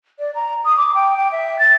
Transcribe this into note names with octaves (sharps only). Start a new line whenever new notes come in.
D5
A#5
D#6
D6
G5
G5
E5
A6